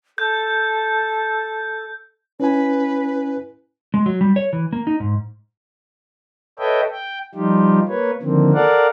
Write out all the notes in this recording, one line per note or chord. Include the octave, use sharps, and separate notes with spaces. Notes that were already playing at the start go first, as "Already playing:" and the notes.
A4 G6
C#4 E4 B4 G#5
G#3
F#3
G3
C#5
E3
A#3
D#4
G#2
A4 B4 C#5 D#5 E5 G5
G5
F3 G3 D#4 F4 G4
A#3 B4 C#5
D3 D#3 F3 A#3 C4
A4 A#4 D5 F5 F#5